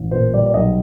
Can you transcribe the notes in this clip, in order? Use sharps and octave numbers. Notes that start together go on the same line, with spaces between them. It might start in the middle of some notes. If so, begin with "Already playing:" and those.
Already playing: A1
A#2 C5
G3 D5
D5
B1 D#5